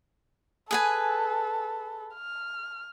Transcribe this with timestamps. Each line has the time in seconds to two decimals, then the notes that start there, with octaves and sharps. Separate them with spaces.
0.71 G#4 A4 B4 G#5
2.15 F6